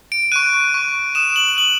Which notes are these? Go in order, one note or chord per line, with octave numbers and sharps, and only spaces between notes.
D7
C#6 F#6 D#7
C#6 F#6
D#6 F#6 E7
F#7
D#6 F#6 F#7